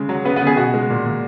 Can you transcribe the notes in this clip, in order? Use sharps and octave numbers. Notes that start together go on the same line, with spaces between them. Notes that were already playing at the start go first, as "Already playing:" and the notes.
Already playing: C#3 G#3
F#3
C#3 B3 B4
B3 B4
C#3
G#4
B2 F#4
G#3
A#2
A#2